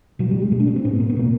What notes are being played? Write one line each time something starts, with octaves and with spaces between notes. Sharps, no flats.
B2 F#3
G3
G#3
B2 A3
D4
C#4
C4
A2 B3
A#3
B3
B2 A#3